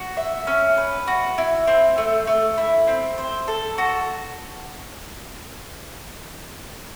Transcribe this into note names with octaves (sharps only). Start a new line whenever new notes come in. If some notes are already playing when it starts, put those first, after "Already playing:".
Already playing: F#4
E5
C#4
B4
F#4
E4
C4
A3
A3
E4
C4
C5
A4
F#4